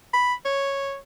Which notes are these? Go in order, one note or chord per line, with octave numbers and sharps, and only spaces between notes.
B5
C#5